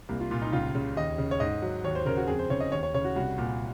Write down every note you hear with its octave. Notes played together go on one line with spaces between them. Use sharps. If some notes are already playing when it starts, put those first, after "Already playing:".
C2 A#3
F4
A#2 F4
D#4
C#2 F4
C#3
D#2 D#5
C#3
C#5
G#2 D#5
F#3
D#2 C#5
C5
C#3 A#4
F#4
F2 G#4
C5
C#3 C#5
D#5
D#2 C#5
C#5
C#3 C#5
F#4
C2 F#4
A#2